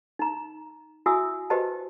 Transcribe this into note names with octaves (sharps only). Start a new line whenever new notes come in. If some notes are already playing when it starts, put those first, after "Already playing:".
D#4 A#5
E4 F#4 E5 G#5 D#6 E6
F#4 G4 B4 C5 D#5 A5